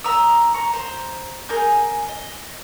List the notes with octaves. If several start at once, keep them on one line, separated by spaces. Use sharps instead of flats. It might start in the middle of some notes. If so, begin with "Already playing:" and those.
E5 A#5 D#6 E6
A#5 C#6
C5 A#5
G#4 A#4 G#5 G6
D#5